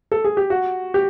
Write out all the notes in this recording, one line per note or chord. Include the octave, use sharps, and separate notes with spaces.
A4
G#4
G4
F#4
G4